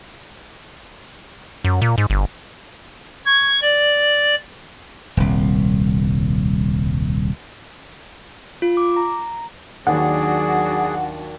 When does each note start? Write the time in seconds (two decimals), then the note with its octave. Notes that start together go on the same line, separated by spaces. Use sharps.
1.64 F#2
1.82 A#2
1.98 G#2
2.10 G1
3.26 C#6 G#6
3.62 D5
5.17 D#1 C2
8.62 F4
8.77 D6
8.96 A#5
9.87 D#2 D#3 F#3 D4 F#4 G#4 D5 F#5